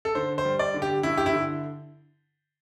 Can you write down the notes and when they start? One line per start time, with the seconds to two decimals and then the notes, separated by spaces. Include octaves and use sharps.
0.05 A4
0.15 D3 C5
0.38 C5
0.45 G3
0.59 D5
0.74 D3
0.82 G4
1.03 G2 E4
1.17 G4
1.26 E4
1.33 D3